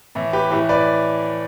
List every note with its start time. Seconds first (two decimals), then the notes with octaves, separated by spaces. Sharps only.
0.15 A2 E3
0.33 G4 B4
0.51 A2 E3 G4 B4
0.69 B4 D5